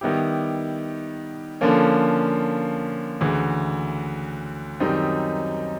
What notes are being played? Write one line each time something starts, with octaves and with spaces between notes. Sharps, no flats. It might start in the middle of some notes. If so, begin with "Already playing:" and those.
D#3 G3 B3 E4 G4
D3 F3 A#3 C#4
D2 C#3 E3
F#2 D#3 G3 C4 D#4